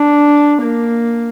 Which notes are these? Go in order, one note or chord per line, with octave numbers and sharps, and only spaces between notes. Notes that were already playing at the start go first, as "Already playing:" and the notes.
Already playing: D4
A#3